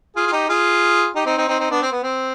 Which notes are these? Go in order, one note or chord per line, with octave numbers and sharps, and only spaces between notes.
F4 G#4
F4
D#4 G4
F4 G#4
D#4 G4
C4 D#4
C4 D#4
C4 D#4
C4 D#4
B3 D4
C4
B3
C4